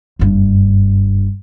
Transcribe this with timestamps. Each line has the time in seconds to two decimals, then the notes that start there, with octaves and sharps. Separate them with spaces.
0.19 F#1 G2